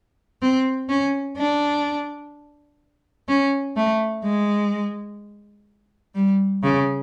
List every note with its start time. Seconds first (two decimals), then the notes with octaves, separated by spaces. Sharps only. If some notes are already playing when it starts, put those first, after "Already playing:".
0.42 C4
0.89 C#4
1.37 D4
3.28 C#4
3.76 A3
4.24 G#3
6.15 G3
6.63 C#3